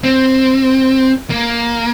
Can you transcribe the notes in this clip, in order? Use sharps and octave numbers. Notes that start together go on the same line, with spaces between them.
C4
A#3